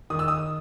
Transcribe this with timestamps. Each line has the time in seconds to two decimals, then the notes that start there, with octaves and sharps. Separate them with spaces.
0.10 D#3 D#6
0.19 E6
0.28 D#6